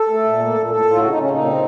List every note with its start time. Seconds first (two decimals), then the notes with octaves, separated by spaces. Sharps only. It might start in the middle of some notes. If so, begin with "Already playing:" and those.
Already playing: A4
0.09 A3
0.24 A#2
0.39 A#3
0.54 A#2
0.69 A2 A4
0.85 A2
0.91 F4
1.00 C#3 F#4
1.10 D#4
1.15 C#3
1.20 C#4
1.30 A#2 D#4
1.45 C4